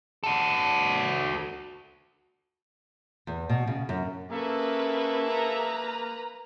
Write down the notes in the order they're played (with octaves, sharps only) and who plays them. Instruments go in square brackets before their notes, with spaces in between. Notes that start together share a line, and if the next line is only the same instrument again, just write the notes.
[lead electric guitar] F#4 A4
[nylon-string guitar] E2
B2
C#3
F#2
[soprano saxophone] A#3 [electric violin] C#4 B4 [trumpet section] G#4 A4 E5
[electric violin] B4 A#5